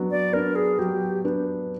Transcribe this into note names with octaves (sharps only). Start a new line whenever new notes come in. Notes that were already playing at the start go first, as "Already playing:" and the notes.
Already playing: F#3 B3 D4
D5
B3 D4 A#4
G#4
F#3 G4
B3 D4